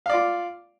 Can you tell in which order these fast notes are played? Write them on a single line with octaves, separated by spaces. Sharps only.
F5 D5 F4